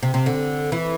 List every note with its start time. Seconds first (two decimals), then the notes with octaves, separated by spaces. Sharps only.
0.03 C3
0.14 C3
0.26 D3
0.72 E3